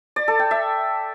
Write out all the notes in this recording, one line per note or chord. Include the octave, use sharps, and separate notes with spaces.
D5
A4
G5
E5